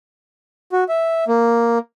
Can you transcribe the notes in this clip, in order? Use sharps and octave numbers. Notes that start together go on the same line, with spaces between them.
F#4
E5
A#3